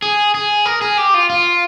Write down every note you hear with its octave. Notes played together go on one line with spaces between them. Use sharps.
G#4
G#4
A#4
G#4
G4
F4
F4